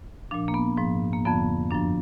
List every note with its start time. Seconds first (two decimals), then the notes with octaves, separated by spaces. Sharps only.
0.31 A#2 F3 D4
0.48 A#3
0.54 B3
0.77 G#2 F3
1.13 A#3
1.25 F2 D3 F3 B3
1.71 F#2 F3 D4